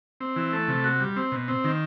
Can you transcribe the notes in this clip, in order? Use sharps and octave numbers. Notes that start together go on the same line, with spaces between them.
C4
E3
A3
C3
F#4
G3
C4
B2
C4
D#3